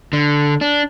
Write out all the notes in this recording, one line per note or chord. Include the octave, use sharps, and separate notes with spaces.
D3
D4